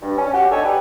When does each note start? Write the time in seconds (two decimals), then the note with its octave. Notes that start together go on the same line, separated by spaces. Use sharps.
0.02 G2
0.17 C#4
0.33 F#4 G4
0.51 D4 D#4 A4 C#5 G#5
0.64 G4 B4